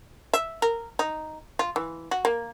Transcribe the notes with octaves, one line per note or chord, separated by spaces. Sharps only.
E5
A#4
D#4
F4
E3
F#4
A#3